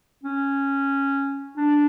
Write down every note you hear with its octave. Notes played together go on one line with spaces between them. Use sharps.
C#4
D4